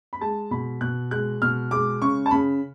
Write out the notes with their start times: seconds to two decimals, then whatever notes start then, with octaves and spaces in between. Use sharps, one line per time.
0.13 B5
0.21 G#3 A5
0.51 B2 B5
0.81 B2 F#6
1.11 G#3 F#6
1.42 B2 F6
1.71 G#3 D6
2.02 C#3 C#6
2.26 A5
2.31 C#3 B5